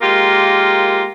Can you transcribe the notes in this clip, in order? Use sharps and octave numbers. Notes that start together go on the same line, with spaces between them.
G#3 A#3 F4 G4 A#4